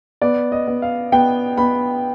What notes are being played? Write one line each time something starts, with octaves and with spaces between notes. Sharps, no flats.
B3 D5
D#5
B3
F5
B3 G5
B3 B5